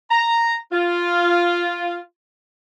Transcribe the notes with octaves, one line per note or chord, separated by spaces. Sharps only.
A#5
F4